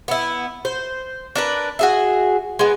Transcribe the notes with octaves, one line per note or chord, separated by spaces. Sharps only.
B3 E4
C5
D4 A#4 B4
F#4 G#4 E5
G#3 B3